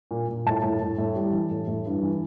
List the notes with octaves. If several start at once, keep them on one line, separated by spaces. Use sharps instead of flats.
A#2
A#2
A2 A5
A2
A2
A2
G3
E3
A2
A2
G2
E3